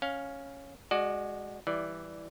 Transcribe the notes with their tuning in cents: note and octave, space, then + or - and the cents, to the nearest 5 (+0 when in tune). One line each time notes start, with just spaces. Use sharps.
C#4 +0 F5 +10
G#3 +0 F#4 +5 D5 +30
E3 +0 G3 +0 D5 +0